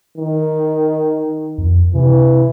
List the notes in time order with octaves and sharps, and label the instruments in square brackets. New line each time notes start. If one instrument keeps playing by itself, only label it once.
[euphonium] D#3
[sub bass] F2
[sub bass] C3 [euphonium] E3